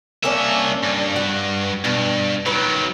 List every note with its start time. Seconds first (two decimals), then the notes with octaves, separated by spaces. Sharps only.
0.24 C2 A#3 C#4 D4 E5
0.84 G2
1.16 F#4
1.85 G2 B2
2.46 D#3 F#3 B4